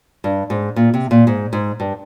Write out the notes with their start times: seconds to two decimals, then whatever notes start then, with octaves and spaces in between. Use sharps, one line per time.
0.24 G2
0.50 G#2
0.76 A#2
0.94 C3
1.11 A#2
1.27 G#2
1.53 G#2
1.80 G2